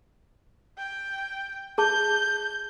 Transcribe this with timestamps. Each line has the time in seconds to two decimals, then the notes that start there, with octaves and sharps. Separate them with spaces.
0.78 G5
1.78 G#4 A5 G6